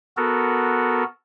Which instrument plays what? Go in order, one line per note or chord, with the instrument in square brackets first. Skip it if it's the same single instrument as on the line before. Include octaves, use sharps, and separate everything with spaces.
[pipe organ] B3 F#4 A4 A#4